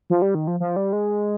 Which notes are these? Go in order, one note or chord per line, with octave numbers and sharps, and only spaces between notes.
F3
G3
D#3
F3
F3
G3
G#3